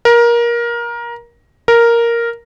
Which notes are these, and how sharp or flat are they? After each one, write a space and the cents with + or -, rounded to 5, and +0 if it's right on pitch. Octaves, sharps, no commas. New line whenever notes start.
A#4 +20
A#4 +0